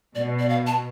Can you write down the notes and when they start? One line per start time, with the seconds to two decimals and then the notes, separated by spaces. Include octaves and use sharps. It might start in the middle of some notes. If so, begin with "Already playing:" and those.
0.15 B2 D5
0.40 D5
0.49 F5
0.67 A5